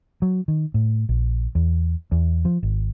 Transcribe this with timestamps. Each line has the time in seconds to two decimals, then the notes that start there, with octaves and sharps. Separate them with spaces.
0.22 F#3
0.48 D#3
0.74 A2
1.09 A#1
1.55 E2
2.12 E2
2.45 F3
2.63 G#1